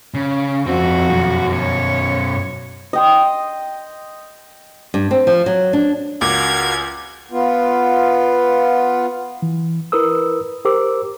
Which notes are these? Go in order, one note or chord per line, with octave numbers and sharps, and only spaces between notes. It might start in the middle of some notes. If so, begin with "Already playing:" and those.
C#3
F2 C4 D#4 F#4
F#2 B2
C#5
D#5 G5 C6
G2
C4
F3
F#3
D4
C#2 F#4 A#4 F5 D6 G#6
B3 F4
E3
E4 A#4 B4 D#6 E6
G4 A#4 C5 D6 E6